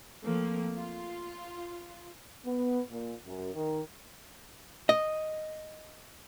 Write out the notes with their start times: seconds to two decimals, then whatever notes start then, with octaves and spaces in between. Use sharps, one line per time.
0.22 F3 A3 A#3 C4
0.75 F4
2.45 B3
2.90 A#2
3.25 F#2
3.54 D#3
4.89 D#5